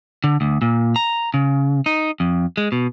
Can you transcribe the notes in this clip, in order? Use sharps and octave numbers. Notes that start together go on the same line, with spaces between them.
D3
D2
A#2
A#5
C#3
D#4
F2
G#3
B2